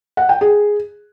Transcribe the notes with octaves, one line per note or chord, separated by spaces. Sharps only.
F#5
G5
G#4